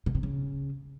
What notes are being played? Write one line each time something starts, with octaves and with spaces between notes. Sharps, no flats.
B2
C3
C#3